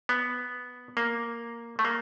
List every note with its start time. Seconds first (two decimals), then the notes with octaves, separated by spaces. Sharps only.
0.09 B3
0.97 A#3
1.79 A3
1.85 A#3